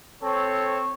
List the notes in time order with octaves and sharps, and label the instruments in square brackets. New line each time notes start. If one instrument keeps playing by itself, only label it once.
[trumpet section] C4 A4 C#5